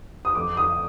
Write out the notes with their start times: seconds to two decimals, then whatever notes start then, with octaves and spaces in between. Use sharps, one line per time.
0.25 D#6
0.35 F2 D6
0.57 D#6